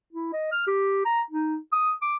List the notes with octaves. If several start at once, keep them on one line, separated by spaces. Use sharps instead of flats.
E4
D#5
F6
G4
A#5
D#4
D#6
D6